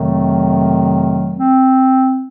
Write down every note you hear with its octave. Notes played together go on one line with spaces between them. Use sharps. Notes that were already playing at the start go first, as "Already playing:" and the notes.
Already playing: F2 C3 D#3 F#3 A3
C4